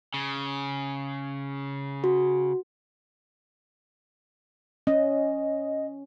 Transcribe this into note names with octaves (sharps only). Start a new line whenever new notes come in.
C#3
F#4
C#4 D#5